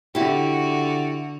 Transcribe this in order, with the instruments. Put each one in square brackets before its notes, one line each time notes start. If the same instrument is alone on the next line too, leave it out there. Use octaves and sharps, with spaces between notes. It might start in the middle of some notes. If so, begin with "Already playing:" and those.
[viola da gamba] D3 F#4 [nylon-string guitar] E4 G4